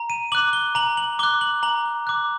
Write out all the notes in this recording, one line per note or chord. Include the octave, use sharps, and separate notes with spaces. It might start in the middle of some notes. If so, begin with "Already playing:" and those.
Already playing: A#5
D#7
D6 F#6 F#7
G7
A#5 F#7
F#7
D6 F#6 G7
F#7
A#5 F#7
D6 F#6